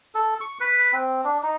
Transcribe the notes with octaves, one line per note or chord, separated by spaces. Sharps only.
A4
C#6
B4
C4
D4
D#4